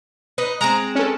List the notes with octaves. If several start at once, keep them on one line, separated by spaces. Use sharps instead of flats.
D#4 B4
G#3 C4 A#5
C#4 A4